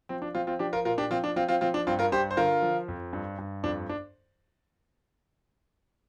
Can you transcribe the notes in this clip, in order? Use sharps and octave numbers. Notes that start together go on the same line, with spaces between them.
F3 C4
D4
F3 C4 F4
C4 F4
F3 D4 G4
F4 A#4
A#2 F4 A#4
D4 G4
F3 C4 F4
D4
F3 C4 F4
C4 F4
F3 C4 F4
D4
G2 C4 F4
F4 A#4
G2 G4 C5
C5
D3 F4 A#4
F3
F2
G2
G2
F2 D4
D4